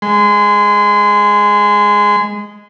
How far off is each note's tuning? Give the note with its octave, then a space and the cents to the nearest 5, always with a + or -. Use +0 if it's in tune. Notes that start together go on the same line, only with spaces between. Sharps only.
G#3 +0 C6 -35